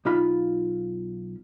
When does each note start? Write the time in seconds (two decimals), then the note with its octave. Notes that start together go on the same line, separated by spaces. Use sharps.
0.05 B1 D#4 F4 B5